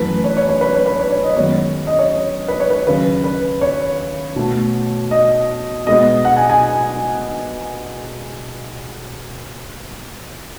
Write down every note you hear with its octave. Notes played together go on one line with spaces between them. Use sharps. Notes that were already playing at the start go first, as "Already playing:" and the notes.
Already playing: F#2 E3 A3 B4
C#5
C#5
C#5
B4
C#5
B4
C#5
C#5
D#5
F#2 D#3 G#3 B3 C#5
D#5
C#5
B4
C#5
B4
D#2 C#3 F#3 B4
B4
C#5
B2 A3
D#5
B2 G#3 B3 D#5
F#5
G#5
G#5